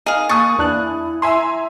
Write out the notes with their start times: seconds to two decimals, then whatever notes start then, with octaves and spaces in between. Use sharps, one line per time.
0.06 D#4 G#4 F5
0.29 A#3 G#5 C#6 D#6 A6
0.58 E2 D4 E4 F#6
1.22 E5 G#5 A#5 C6 E6